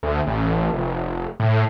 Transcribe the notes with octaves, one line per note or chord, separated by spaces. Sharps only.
D2
A1
F1
A2